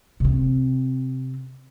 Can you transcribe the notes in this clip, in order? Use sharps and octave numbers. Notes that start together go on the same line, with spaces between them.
C3 C4